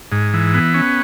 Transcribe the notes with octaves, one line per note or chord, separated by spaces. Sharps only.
G#2
E3
B3
C#4